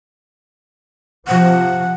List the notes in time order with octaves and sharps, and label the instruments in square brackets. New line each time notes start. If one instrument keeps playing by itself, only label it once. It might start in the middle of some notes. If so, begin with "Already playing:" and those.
[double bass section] C3 F3 [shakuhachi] F#5